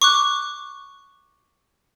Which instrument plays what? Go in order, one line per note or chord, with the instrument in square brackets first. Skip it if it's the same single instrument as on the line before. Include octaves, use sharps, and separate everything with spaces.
[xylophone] C#6 D6 F#6